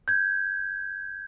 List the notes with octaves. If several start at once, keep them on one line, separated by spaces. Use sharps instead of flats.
G6 G#6